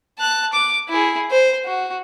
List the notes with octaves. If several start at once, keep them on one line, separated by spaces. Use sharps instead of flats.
A5 F#6
D6
E4 G#4
C5
F#4